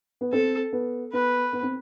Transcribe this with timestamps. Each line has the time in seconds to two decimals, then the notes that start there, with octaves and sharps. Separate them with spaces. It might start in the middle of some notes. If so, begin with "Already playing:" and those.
0.21 B3
0.33 C4 A4
0.73 B3
1.13 B3 B4
1.53 B3
1.63 C4